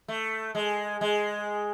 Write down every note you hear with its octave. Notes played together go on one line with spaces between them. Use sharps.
A3
G#3
G#3